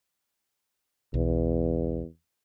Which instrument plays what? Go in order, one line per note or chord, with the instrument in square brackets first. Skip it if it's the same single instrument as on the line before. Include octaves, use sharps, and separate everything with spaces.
[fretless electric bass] B1 [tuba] E2